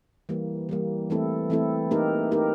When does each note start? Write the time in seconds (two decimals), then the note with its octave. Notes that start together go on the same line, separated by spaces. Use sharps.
0.29 E3 G3 A#3
0.69 E3 G3 A#3
1.10 E3 A3 C4 E4 A4
1.50 E3 A3 C4 E4 A4
1.91 A#3 D#4 G4 A#4
2.31 A#3 D#4 G4 A#4